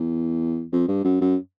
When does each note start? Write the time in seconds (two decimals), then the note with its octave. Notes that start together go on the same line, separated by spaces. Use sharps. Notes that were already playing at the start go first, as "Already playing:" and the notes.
Already playing: E2
0.72 F2
0.88 G2
1.05 F#2
1.21 F#2